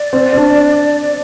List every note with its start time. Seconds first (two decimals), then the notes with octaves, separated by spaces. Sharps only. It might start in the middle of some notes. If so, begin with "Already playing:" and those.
Already playing: D5
0.13 C4
0.33 C4
0.37 D4